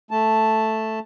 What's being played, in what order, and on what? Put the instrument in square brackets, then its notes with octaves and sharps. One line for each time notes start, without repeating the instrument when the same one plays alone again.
[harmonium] A3 A5